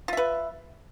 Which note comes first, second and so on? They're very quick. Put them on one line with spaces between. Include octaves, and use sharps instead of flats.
F4 E5 B4